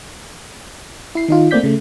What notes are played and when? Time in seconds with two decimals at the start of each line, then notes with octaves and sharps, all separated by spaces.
1.15 E4 C7
1.28 D#3 D#4 F4
1.51 A3 A#3 C4 D5 G6 B6
1.63 C#3 A3